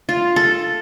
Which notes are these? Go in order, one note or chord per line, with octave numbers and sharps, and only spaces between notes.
F4
A4